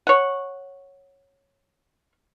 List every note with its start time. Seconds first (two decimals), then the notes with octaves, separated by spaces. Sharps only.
0.07 C#5 F#5